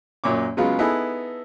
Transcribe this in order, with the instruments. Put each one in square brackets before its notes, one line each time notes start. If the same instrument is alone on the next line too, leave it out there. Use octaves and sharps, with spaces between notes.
[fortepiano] F#2 A#2 C#5 D6
C#3 F#3 G#3 B3 F4
B3 D#4 E4 G#4 A4 B4